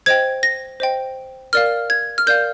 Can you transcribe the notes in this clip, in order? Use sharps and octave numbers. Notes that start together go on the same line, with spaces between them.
C5 D#5 G5 G#6
A#6
C5 D#5 G5
A#4 D5 F5 F6
G#6
F6
A#4 D5 F5 G6